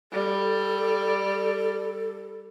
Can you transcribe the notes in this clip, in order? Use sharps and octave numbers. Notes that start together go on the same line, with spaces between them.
G3 A4